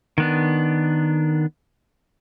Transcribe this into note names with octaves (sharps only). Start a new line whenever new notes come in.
D#3 B3 D4